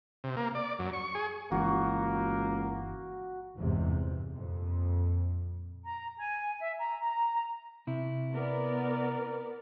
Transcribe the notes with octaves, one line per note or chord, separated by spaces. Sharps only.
C3
A#3
D5
F#2
C#6
G#4
G1 C#2 E3 A#3 F#4
G1 E2 G#2 C3
F2 A#2
A#5
G#5
E5
A#5
A#5
C3 E4
B3 A#4 D5